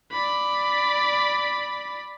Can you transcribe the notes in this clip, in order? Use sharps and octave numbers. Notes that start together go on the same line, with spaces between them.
D5 B5